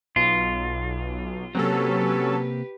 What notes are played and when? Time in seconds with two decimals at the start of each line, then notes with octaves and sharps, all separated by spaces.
0.16 B1 F4
1.55 C3 F#3 A#3 C4 C#4 G4 A4 B4